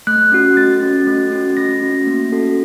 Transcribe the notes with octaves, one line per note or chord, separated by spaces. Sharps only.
A3 F#6
C#4 F#4
A3 A6
C#4 F#4
A3
C#4 F#4
A3 A#6
C#4 F#4
A#3
C#4 F#4 A4